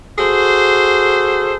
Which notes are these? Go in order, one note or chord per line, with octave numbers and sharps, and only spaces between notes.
F#4 G#4 A4 C5